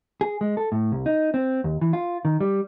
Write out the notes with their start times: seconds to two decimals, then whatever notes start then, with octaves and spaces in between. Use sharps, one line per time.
0.21 G#4
0.41 G#3
0.57 A4
0.72 A2
0.92 C2
1.06 D#4
1.34 C4
1.64 D#2
1.81 E3
1.93 F4
2.25 D#3
2.40 G3